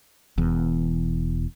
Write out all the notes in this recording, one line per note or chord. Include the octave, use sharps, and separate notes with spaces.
E1 E2